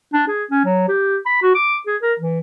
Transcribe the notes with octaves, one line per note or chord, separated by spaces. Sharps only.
D4
G#4
C#4
F#3
G4
B5
F#4
D6
G#4
A#4
E3